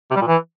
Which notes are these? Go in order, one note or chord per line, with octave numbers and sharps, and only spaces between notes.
C3
G3
A#2
E3